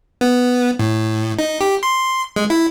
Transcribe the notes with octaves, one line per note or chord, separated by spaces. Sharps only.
B3
A2
D#4
G4
C6
G#3
E4